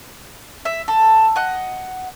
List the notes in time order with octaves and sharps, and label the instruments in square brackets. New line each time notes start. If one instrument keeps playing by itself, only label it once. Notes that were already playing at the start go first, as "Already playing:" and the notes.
[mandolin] E5
A4
D#5 F#5